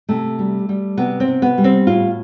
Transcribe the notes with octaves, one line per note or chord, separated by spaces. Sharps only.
C3 A3
G3
G3
C3 B3
C4
C3
B3
G3
C4
A2 F4